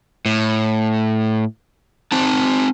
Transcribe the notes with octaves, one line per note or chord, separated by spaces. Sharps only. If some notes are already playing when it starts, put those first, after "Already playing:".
A2
C4 D#4 A5